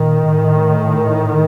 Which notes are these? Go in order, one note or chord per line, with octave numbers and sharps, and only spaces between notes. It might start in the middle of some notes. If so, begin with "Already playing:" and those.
Already playing: A#2 D#3
A2